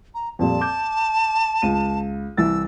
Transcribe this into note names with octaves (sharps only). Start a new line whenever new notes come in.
A#5
F2 A#2 G3 A5
D6 G6
C#2 D#7
C2 E3 E6 A6